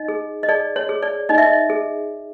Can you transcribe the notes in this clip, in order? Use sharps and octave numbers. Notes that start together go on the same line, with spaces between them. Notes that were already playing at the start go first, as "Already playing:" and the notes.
Already playing: D#4 D#5
G#4
D#5
G#4 D5
C#5
G#4
D5
D#4 D#5
E5
D#5
G#4